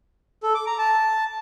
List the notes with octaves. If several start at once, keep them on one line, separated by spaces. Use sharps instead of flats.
A4
D6
A#5
A5